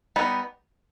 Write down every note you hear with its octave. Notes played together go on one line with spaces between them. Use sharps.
G3 B3 D#4